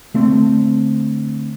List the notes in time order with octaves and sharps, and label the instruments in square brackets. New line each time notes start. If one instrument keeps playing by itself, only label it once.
[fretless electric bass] D3 A3 C4